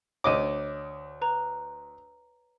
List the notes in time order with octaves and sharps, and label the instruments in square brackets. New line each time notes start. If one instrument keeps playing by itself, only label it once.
[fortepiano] D2 D#5 D6 [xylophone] C#5 D#7
[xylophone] B4 A#5